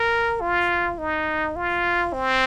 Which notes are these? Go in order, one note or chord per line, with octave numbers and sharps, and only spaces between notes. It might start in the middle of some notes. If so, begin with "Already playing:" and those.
Already playing: A#4
F4
D#4
F4
C4